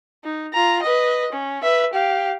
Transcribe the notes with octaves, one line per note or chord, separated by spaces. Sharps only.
D#4
F4 A#5
B4 D#5
C#4
B4 E5
G4 F5